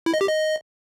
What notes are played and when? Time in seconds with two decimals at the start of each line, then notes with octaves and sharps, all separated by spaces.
0.06 E4
0.14 D#5
0.21 G4
0.28 D#5